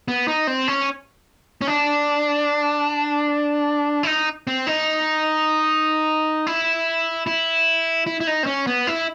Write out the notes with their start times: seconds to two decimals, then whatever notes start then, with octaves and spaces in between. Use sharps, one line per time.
0.08 B3
0.28 D#4
0.47 C4
0.68 C#4
1.61 C#4
1.67 D4
4.03 E4
4.07 D#4
4.47 C4
4.67 D#4
6.47 E4
7.27 E4
8.07 E4
8.20 E4
8.27 D#4
8.43 C4
8.46 C#4
8.67 B3
8.87 E4